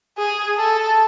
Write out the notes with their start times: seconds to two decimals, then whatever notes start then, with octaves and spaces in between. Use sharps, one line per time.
0.18 G#4
0.58 A4